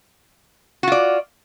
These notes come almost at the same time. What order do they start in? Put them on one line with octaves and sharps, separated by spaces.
F#4 F4 D5